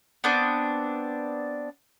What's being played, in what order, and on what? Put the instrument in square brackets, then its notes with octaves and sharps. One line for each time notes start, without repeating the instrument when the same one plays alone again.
[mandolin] B3 C4 D4